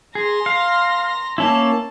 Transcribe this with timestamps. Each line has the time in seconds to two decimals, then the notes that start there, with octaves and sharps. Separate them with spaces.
0.15 G#4 A#5 C6
0.46 F5
1.38 A#3 C#4 E4 A5